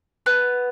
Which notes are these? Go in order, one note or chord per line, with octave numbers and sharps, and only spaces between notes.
B3